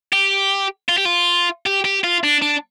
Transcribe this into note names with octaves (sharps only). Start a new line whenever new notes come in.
G4
F4
G4
F4
G4
G4
F4
D4
D4